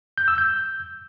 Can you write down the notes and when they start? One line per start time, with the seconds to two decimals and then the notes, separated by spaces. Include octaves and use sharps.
0.18 G6
0.28 E6
0.38 G6